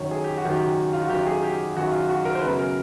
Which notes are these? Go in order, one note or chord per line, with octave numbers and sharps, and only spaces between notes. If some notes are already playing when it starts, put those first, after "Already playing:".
Already playing: F#2 D#3 F#3 C#5
G#4
G4
F#4
F#2 D#3 F#3
G4
F4
F#4
F#2 D#3 F#3 G4
G#4
G4
F#2 D#3 F#3 F#4
F4
F#4
A#4
C5
F#2 C#3 F#3 B3 B4
A#4